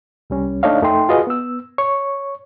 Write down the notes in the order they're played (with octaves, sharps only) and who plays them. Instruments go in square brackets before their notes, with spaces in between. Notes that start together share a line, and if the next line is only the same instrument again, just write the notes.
[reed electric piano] C2 G3 C#4
A3 D4 D#4 C#5 D#5 F5
F2 A3 D#4 A4 G5 C6
F4 F#4 G#4 B4 D#5
B3 E6
C#5 C#6